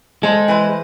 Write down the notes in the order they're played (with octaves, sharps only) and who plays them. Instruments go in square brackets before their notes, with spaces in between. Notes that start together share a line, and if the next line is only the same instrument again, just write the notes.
[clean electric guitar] G#3 [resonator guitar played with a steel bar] A4 C5
[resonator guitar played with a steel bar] E3 B4 C5